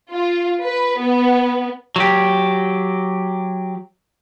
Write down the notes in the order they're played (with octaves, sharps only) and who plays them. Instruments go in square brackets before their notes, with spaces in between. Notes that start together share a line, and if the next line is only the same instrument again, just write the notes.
[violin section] F4
B4
B3
[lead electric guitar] F#3 G4